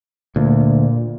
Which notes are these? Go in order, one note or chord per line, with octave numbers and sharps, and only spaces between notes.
D2 A#2